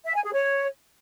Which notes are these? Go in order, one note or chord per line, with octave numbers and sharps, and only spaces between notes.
E5
G#5
G#4
C#5